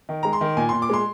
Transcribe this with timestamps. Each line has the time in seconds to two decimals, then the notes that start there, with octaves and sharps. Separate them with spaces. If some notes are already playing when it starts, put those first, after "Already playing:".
0.09 D#3
0.23 G#3 A#5
0.33 C6
0.41 D#3
0.57 A#2 G#5
0.69 A#2 C6
0.82 D6
0.89 G#3 C6